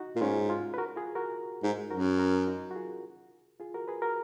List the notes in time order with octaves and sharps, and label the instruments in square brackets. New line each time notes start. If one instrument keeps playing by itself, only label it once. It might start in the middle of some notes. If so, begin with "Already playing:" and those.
Already playing: [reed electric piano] D#4 F#4
[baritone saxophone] A#2
[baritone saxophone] G#2 [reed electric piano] C#4 F4
[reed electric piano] F4 G#4
B4
F#4 A#4
F4 G#4
F#4 A#4
[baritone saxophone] G#2
[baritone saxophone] F#2 [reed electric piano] F#4 A#4
[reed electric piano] F#4 A#4
D#4 F#4
F#4
F4 G#4
F4 G#4
F#4 A#4
G#4 B4
F#4 A#4